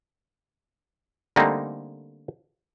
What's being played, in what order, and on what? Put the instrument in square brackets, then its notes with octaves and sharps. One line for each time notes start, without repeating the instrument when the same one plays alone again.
[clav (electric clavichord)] D3 G3 A3 A#3 C4 D#4